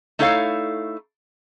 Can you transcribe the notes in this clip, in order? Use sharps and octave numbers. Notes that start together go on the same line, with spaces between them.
A3 D#4 E4 A4 C#5 F5